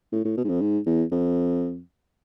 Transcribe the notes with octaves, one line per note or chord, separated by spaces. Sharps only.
A2
A2
B2
G#2
F2
G#2
E2
F2